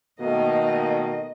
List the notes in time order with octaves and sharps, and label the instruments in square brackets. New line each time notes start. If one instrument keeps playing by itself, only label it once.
[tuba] B2 [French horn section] D#3 A3 A#3 [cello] D#5